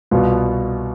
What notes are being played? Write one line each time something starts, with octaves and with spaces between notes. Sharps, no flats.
C2 B2 B3 F4